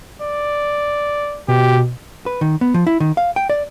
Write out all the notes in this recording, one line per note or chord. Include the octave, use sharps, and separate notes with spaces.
D5
B2 G4
B4
D#3
B3
F3
E4
D#3
F5
G5
D5